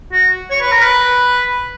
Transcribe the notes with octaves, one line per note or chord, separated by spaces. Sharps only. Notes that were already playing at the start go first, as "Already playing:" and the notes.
F#4
C#5
B4
A#4
B4